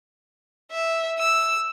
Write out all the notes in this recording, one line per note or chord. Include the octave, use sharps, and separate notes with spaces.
E5
E6